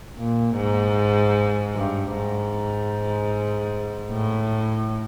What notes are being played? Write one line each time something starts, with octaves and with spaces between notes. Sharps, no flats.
A#2
G#2
G2
G#2
A2